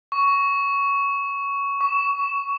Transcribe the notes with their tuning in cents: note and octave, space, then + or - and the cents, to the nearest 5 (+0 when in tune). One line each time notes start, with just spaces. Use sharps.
C#6 +10
C#6 +25